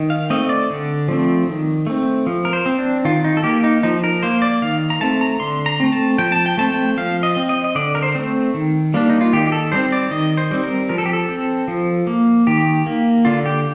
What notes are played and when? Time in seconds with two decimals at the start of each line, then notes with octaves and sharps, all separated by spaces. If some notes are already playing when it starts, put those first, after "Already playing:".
Already playing: D#3
0.10 F5
0.30 A3 C4 D#5
0.49 D5
0.70 D3
1.08 F3 A3 C4
1.47 D#3
1.87 A3 C4
2.27 F3
2.45 A#4
2.53 C5
2.66 C4
2.79 D4
3.05 D#3 F4
3.24 D#4
3.37 A4
3.44 A#3 G4
3.64 D#4
3.83 F3 D#4
4.04 A#4
4.23 A#3 C5
4.42 D5
4.62 D#3 F5
4.90 A#5
5.01 A3 C4 A5
5.21 A#5
5.40 D3 C6
5.66 A#5
5.80 A3 C4
5.92 A5
6.18 F3 G5
6.32 A5
6.46 G5
6.58 A3 C4 A5
6.72 G5
6.97 F3 F5
7.23 D#5
7.36 C4
7.49 D#5
7.64 D#5
7.75 D3 D5
7.95 A#4
8.02 C5
8.15 A3 C4
8.54 D#3
8.94 G3 A#3 D4
9.10 D#4
9.21 F4
9.33 D#3 G4
9.47 G4
9.52 A4
9.72 G3 C4 C5
9.92 D5
10.11 D#3 D#5
10.37 C5
10.51 G3 C4
10.63 A#4
10.89 F3 A#4
10.98 A4
11.05 G4
11.13 A4
11.29 C4
11.68 F3
12.07 A#3
12.47 D#3 G4
12.86 A#3
13.25 D3 F4
13.46 G4